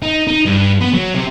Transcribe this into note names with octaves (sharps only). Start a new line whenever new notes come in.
D#4
D#4
G2
B3
F#3
C3